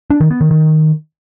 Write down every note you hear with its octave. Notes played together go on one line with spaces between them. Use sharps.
D4
D#3
B3
D#3
D#3